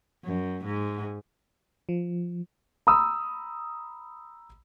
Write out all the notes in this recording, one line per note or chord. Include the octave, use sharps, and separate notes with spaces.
F#2
G#2
F3
A#5 B5 D#6 E6